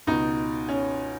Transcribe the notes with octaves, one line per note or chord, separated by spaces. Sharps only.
C#2 B2 D#4
C#4